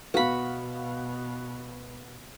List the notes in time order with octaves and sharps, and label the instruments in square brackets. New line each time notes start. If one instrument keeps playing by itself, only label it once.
[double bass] B2 [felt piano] B3 F5 [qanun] F#4 B5